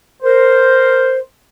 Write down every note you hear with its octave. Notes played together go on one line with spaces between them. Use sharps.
A#4 C5